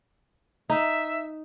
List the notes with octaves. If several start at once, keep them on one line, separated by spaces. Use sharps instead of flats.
D#4 E5